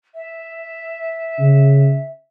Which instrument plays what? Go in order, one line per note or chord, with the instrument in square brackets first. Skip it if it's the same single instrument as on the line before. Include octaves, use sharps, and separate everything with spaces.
[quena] E5
[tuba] C#3